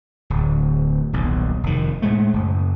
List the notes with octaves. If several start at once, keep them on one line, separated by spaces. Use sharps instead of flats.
D1
D#1 B1
F1 D#3
A2 G#3 A3
F#1